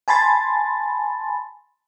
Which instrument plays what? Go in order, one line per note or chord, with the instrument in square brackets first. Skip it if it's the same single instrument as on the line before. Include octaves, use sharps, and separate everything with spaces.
[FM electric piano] G#5 A5 B5 C6 A6